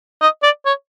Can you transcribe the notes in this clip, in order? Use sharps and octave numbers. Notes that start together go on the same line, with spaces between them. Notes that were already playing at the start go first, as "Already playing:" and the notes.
D#5
D5
C#5